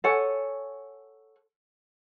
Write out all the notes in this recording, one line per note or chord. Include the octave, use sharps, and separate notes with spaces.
A4 C#5 F#5 G#5